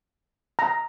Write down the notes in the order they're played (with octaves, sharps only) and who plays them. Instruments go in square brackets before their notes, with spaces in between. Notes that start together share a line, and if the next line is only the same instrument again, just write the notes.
[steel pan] A#5